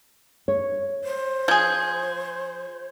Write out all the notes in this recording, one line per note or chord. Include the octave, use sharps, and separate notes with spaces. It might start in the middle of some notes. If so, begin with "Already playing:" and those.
C#5
C5
F3 G#4 G6 G#6